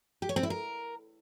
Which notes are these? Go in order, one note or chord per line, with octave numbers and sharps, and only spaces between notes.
G4
C#5
C4
E4
A#4